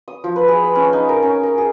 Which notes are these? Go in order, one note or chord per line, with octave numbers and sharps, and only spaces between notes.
D#6
F3
B4
G#4
B5
C#4
D#4
A#4
C#4
A#4
G#4